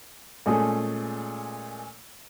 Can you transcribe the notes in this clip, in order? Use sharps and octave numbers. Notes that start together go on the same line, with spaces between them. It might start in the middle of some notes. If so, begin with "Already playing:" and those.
A#2 G#3 A3 C#4 G#4 A4